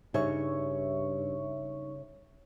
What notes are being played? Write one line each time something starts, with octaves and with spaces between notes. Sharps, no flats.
G2 C#3 G3 D#4 C#5 E5 C#6